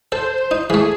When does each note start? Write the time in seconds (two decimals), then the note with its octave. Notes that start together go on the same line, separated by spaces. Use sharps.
0.12 A4 C5
0.51 D#4
0.70 E3 A3 G#4